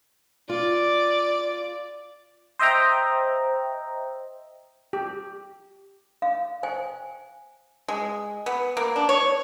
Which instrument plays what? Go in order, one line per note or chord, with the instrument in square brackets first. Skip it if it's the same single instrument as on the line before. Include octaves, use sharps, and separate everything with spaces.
[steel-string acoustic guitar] F4 [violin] D5
[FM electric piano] C5 D#5 E5 G5 A#5
[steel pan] G4
[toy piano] F5
C5 G5 G#5
[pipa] G#3
B3
A#3
D4
C#5